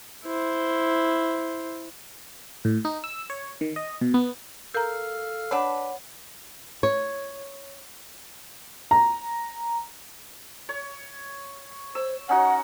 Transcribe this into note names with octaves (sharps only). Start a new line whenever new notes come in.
E4 C5
A2
D#4
E6
C#5
D#3
D#5
B2
B3
A4 A#4 F5 A#5 F6
D4 B4 C#5 F#5
C#5
A#5
C#5
C5 E6
C#4 D#4 F#4 F#5